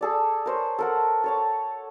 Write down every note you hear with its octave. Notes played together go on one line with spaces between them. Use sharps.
G#4 A4 D5
A#4 C5 C#5
A4 A#4 F#5
A4 C#5 A5